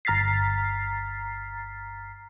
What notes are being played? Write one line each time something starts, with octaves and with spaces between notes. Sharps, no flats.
G1 A#5 F6 A6 B6 C7